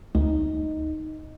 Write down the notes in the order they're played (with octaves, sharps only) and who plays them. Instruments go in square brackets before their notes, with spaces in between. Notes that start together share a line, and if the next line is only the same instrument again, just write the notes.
[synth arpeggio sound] D2 [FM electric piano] D#4